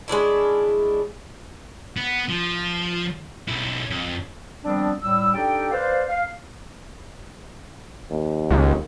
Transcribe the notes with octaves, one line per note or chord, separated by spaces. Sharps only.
G#3 C#4 D4 E4
B3
F3
B1 E4
F2
D#3 F3 G3 B3 C4 D4
A2 G3 E6
D4 D#4 G4 A4 D5 G5
B4 C5 D5 F5
F5
D#2
C#2